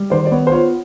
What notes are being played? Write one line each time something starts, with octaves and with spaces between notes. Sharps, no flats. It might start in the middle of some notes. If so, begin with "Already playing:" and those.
Already playing: G3
D#3 C5 D5
D5
B3 C#5
C5
F4 C#5